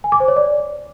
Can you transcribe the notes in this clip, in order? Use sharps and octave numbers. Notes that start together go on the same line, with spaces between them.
G#5
D6
C5
C#5
D5